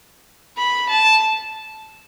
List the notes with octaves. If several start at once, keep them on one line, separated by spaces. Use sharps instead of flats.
B5
A5